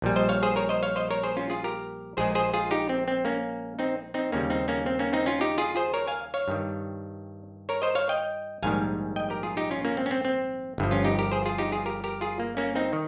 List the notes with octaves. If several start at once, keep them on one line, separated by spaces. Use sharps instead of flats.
A#1 A#2 G3
C5 D#5
C#5 F5
G#4 C5
A#4 C#5
C5 D#5
C#5 F5
C5 D#5
A#4 C#5
G#4 C5
C#4 F4
F4 G#4
G4 A#4
A#1 A#2 G#3 G#4 C5
G#4 C5
F4 G#4
D#4 G4
C4
C4
A#3 C#4
C4 D#4
C4 D#4
D#2 C#3 G3 A#3 C#4
C4 D#4
A#3 C#4
C4
A#3 C#4
C4 D#4
C#4 F4
D#4 G4
F4 G#4
G#4 C5
A#4 C#5
F5 G#5
C#5 F5
G2 D#3 G3
A#4 C#5
C5 D#5
C#5 F5
D#5 G5
A#1 G#2 D#3 G3 F5 G#5
D#5 G5
G4 A#4
F4 G#4
D#4 G4
C#4 F4
A#3 C#4
C4
C#4
C4
C4
G1 G2 F3
C#4 F4
D#4 G4
G4 A#4
G#4 C5
F4 G#4
D#4 G4
F4 G#4
G4 A#4
G4 A#4
F4 G#4
A#3
A#3 C#4
C4 D#4
D#3